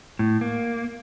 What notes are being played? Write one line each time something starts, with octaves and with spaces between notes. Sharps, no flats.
A2
A#3